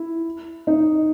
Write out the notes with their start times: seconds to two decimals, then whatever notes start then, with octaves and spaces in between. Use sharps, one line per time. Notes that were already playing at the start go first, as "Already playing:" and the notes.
Already playing: E4
0.67 D#4